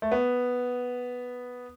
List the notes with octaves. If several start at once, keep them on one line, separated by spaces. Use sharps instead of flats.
A3
B3